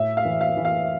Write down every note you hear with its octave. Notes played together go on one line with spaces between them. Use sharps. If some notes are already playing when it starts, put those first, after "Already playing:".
Already playing: A2 E5
F5
E3
F5
E3
F5